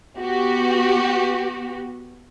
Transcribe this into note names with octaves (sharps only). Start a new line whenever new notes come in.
B3 F#4 G4